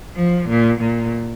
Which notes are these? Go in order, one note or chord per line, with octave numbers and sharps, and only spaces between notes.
F3
A#2
A#2